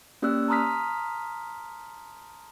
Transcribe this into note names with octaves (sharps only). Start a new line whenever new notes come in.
A#3 C#4 G4 D5 E6 F#6
A5 A#5 C6 D#6 F6 B6